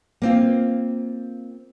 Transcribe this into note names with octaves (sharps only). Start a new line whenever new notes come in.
A#3 C4 F4